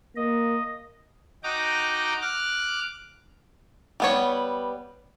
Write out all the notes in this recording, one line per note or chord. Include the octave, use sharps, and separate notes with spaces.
A#3 D#5
D#4 F#4 D#5 G5 A#5 D6
D6 F6 F#6
G3 B3 C#5